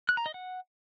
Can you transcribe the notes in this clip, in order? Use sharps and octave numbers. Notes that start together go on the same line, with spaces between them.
F#6
A#5
D#5
F#5